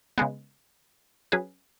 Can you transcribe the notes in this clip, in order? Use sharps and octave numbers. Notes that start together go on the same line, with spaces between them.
C#3 G#3 B3
F#3 C#4 G#4 B4